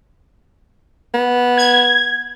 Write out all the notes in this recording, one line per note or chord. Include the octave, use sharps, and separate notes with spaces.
B3
G#6